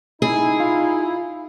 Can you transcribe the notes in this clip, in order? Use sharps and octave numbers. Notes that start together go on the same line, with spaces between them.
D#4 E4 G#4
F4